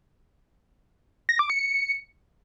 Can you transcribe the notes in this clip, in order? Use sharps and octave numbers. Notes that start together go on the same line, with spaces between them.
A#6
D6
C#7